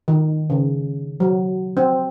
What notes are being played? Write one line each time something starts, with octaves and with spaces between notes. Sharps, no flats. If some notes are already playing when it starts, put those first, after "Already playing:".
D#3
C#3
F#3
C4